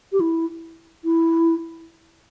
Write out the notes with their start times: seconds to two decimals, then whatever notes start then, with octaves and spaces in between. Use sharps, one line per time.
0.12 G4
0.20 E4
1.04 E4